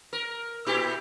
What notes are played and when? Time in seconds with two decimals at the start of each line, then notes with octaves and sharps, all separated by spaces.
0.13 A#4
0.66 A#2 E4 G4